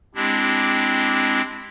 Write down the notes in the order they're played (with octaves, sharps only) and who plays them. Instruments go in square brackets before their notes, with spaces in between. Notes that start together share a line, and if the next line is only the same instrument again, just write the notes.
[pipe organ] G#3 C4 D4 E4 G4